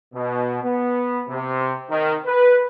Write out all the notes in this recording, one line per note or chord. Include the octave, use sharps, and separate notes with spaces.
B2
B3
C3
D#3
B4